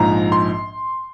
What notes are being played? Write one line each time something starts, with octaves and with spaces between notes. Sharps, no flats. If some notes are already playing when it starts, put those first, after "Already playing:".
Already playing: A#1 G#2 F3 A#5
C6